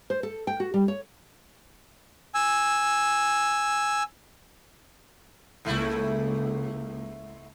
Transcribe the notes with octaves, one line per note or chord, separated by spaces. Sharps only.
C5
A4
G5
F#4
G3
C#5
G#5 E6
C#2 G#2 A3 A#3 E4